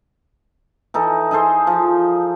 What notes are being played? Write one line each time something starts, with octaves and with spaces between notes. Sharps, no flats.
E3 D#4 A4
D#4 G#4 A4 C5
F3